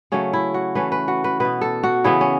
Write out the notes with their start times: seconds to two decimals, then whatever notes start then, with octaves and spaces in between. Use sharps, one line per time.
0.12 C#3 F#3 A3 C#4
0.33 E4
0.54 F#4
0.75 E3 A3 C#4 B4
0.92 B4
1.08 F#4
1.24 B4
1.40 B2 B3 B4
1.61 A4
1.83 F#4
2.04 C#3 E3 B3 E4
2.21 C#4